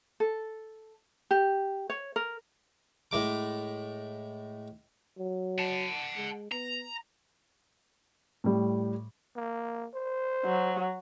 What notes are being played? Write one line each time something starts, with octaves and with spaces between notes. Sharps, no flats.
A4
G4
C#5
A#4
A2 G#3 D6
F#3
F#5 A5
G#3
B3 A#5
A2 G3
A#3
C5
F#3